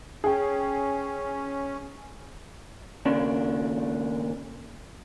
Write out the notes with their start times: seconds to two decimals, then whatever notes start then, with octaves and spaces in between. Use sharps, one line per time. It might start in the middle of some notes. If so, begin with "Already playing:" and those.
0.24 C#4 G#4 G5
3.05 D#2 C#3 D4